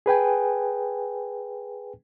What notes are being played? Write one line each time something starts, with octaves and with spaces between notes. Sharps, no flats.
G#4 B4 G5 G#5